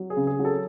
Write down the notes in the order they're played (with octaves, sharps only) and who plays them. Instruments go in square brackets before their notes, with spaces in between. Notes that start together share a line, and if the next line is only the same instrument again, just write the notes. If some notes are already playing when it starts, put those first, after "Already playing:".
Already playing: [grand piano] F#3
G#4
C#3
G#4
F#3
A4